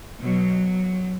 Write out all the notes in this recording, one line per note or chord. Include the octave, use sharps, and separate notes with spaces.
B2 F#3